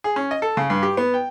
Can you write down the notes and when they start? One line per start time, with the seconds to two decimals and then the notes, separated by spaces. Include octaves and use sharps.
0.04 G#4
0.16 C#4
0.31 D#5
0.42 A4
0.57 C#3
0.70 G2
0.83 G4
0.97 B3
1.14 G5